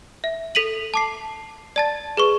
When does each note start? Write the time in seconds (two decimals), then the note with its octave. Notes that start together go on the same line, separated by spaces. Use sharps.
0.24 E5
0.55 A4 B6 D#7 F#7
0.94 A5 D6 C7
1.76 D5 A5 A6
2.17 G#4 B4 C#6